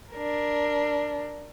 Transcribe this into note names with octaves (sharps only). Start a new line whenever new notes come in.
D4 A#4